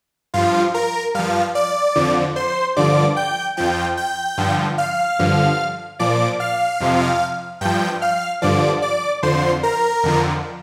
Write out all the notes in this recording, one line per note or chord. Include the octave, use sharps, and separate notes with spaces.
G2 F3 F4 F5
A#4 A#5
G2 F3 F5 F6
D5 D6
F2 D3 F3
C5 C6
G2 D3 F3 D5 D6
G5 G6
F2 F3 G5 G6
G5 G6
G2 D3 F3
F5 F6
G2 D3 F3
A#2 F3 D5 D6
F5 F6
F2 C3 F3
G2 F3 G5 G6
F5 F6
G2 D3 F3 D5 D6
D5 D6
F2 D3 F3 C5 C6
A#4 A#5
F2 D3 F3